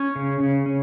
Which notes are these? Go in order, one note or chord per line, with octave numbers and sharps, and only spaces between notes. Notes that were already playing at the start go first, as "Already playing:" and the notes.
Already playing: C#4 C#5
C#3
C#3
C#4